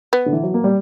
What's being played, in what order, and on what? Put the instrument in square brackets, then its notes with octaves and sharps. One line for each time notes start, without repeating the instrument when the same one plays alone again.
[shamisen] B3
[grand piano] D3
E3
F#3
A#3
G3